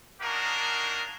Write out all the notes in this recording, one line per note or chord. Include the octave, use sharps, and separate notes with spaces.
A#3 D4 D#4 F#4 G#4 A#4